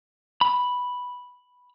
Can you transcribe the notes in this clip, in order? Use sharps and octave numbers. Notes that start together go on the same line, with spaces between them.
B5